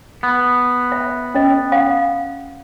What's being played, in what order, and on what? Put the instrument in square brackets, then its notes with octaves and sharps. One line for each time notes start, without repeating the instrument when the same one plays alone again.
[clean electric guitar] B3
[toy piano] E5
C#4 D#5
F5 F#5